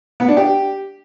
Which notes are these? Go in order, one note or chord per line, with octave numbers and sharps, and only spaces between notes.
B3
D4
G4